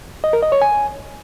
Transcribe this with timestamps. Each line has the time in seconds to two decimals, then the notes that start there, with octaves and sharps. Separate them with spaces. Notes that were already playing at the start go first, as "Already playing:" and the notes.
0.24 D#5
0.33 A#4
0.43 D#5
0.52 C#5
0.62 G#5